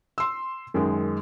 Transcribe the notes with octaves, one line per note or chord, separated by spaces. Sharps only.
C6 E6
F#2 D#3 G#3